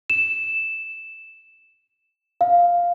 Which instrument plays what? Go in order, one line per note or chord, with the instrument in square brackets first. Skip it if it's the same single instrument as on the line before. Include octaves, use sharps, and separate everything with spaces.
[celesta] E7
F5